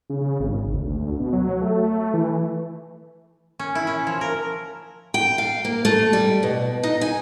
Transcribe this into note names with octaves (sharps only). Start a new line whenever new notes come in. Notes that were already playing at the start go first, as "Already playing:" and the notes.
C#3
C#3
G#1
D2
B2
F#3
A3
E3
C#4
E4
C#4
F3
A#4
G5
F5
A#3
A3
G3
B2
D#4
G#5